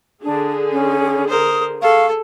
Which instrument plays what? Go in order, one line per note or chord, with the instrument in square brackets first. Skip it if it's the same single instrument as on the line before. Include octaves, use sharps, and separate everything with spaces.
[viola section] D3 G#4 [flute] D4
[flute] C#4
[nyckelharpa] A#4 C5 [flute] D#6
[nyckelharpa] G#4 A4 [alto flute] F5 [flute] C#6